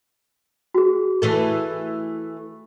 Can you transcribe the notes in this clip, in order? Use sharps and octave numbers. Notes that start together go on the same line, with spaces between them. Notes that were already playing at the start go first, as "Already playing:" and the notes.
F#4 G#4
E3 A3 A4